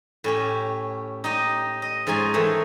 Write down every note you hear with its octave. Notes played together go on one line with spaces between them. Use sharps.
A2 C#4 G4
D#4 G4 D#5
D#5
G#2 F3 C#4 D#4 G#5 C6
D#3 E3 A3 D#4